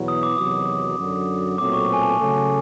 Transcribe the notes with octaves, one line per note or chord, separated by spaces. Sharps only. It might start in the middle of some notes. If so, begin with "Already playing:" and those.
Already playing: E2 B2 F#3 B3 E4
D#6
D6
E2 C3 D#3 F#3 D#6
F#2 D3 F#3
B1 A#2 F#3 A3 C4 D6
C#6
G#5
A5
C#3 F#3 A3